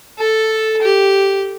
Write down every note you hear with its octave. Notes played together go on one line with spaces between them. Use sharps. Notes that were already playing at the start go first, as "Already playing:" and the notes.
A4
G4